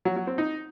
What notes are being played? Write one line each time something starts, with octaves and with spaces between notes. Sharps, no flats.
F#3
F#3
C4
D#4